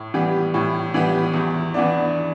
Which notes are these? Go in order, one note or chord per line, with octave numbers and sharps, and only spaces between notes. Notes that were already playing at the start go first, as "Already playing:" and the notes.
Already playing: A2
E3 G3 B3 G4
A2
E3 G3 B3 G4
E2
E3 B3 D4